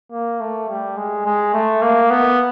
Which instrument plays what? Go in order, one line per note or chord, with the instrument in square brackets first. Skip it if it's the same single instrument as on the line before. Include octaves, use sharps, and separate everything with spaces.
[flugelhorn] A#3
A3
G3
G#3
G#3
A3
A#3
B3